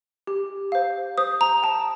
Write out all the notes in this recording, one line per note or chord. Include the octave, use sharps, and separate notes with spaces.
G4
C5 F5
C5 D#6
A#5
G5 A5